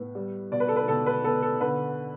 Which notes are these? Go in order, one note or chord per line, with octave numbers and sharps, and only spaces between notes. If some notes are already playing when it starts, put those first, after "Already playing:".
Already playing: A2 B3
G3
B2 D5
B4
A4
B4
B2 A4
B4
B3 A4
A4
D3 B4